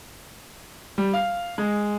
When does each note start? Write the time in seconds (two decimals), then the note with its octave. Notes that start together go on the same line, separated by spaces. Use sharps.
0.98 G3
1.14 F5
1.58 G#3